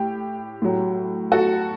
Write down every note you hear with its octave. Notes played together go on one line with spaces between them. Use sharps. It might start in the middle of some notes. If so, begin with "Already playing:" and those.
Already playing: A2 G4
A2 F#3
F#4 A4